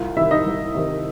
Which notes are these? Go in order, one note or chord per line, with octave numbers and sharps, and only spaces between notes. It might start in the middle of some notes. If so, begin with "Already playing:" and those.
Already playing: C2 F4
C3 D#3 E4 E5
D#4 D#5
C2
C3 D#3